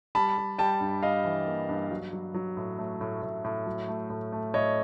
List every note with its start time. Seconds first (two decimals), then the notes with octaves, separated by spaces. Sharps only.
0.15 G3 A5 B5
0.37 G3
0.58 G3 G5 A5
0.81 G2
1.03 G3 D#5 F5
1.25 E3
1.47 A#3
1.69 G2
1.91 F#3
2.13 F#3
2.34 F#3
2.57 A2
2.79 A3
3.01 A2
3.22 A2
3.44 A2
3.66 F#3
3.88 A3
4.10 A2
4.32 A3
4.54 A2 C#5 D#5